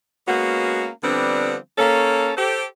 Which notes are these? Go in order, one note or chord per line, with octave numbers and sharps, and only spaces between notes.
G#3 A#3 B3 C#4 F#4
D3 F3 G3 B3 C4 D4
A#3 C#4 A4
G4 A4 C5